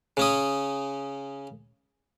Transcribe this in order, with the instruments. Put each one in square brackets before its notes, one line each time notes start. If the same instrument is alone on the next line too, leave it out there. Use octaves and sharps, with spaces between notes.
[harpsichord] C#3 C#4 D#6